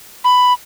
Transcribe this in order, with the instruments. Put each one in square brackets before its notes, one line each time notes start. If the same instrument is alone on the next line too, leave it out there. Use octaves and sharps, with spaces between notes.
[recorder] B5